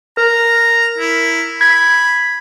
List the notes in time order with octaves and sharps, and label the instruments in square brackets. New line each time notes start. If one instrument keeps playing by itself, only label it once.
[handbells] A#4 [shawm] A#5
[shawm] E4
[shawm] B5 [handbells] G#6